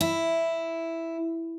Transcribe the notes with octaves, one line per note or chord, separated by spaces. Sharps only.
E4